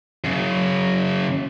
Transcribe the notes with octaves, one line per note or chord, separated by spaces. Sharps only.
F#2 C#3